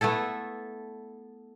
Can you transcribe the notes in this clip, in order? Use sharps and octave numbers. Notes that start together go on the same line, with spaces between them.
A3 B3 E4 A4